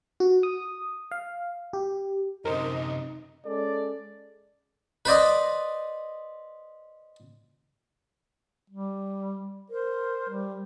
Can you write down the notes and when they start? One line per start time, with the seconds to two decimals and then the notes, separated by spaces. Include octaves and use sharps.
0.20 F#4
0.43 D#6
1.11 F5
1.73 G4
2.45 F#2 C3 D#4 A#4 C5 D#5
3.46 G#3 C#4 A4 D5
5.05 B4 C5 D5 D#5
8.70 G3
9.70 A#4 C5
10.29 G3